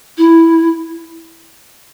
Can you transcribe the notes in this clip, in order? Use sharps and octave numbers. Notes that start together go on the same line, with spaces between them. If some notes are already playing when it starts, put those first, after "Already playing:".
E4